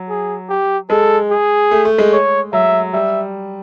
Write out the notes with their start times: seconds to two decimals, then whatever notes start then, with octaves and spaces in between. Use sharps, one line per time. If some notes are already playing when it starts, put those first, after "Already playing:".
Already playing: F#3
0.09 G#4
0.49 G4
0.90 G#3 A4
1.31 G#4
1.71 A3
1.85 A3
1.98 G#3
2.12 C#5
2.53 F#3 E5
2.93 G3 E5